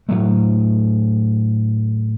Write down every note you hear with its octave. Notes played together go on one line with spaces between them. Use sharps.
A2 F#3 A3